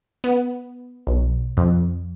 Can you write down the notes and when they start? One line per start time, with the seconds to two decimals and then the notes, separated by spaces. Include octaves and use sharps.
0.24 B3
1.07 B1
1.57 F2